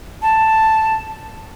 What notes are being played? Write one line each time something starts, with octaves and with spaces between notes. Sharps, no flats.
A5